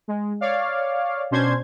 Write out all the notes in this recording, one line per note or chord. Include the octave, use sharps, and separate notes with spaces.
G#3
C#5 D5 F5
B2 C#4 D4 C5 C6 G#6